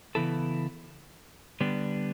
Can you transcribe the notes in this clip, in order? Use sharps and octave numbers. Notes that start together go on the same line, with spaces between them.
C#3 E3 B3 E4 A4
D3 G3 B3 D4